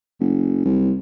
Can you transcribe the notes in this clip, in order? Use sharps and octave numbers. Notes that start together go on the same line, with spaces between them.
F#1
C2